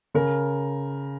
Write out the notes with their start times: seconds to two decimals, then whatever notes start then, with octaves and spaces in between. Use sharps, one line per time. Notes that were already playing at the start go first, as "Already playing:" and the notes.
0.14 C#3 A#4